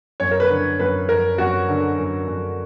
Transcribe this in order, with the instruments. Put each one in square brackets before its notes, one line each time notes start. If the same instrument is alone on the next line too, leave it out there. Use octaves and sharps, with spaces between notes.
[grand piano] F#2 C#5
A#4
B4
D3
F#2 B4
F#2 A#4
F#2 F#4
D3
F#2
F#2